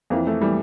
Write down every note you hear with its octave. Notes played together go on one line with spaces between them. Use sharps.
F2 E3 A#3
A3
E3 G3